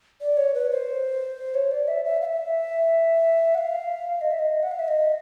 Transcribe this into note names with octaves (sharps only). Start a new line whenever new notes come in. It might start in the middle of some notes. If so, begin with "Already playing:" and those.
D5
C#5
B4
C5
C#5
D5
E5
E5
F5
E5
F#5
F5
D#5
E5
D#5
F#5
F5
E5
D#5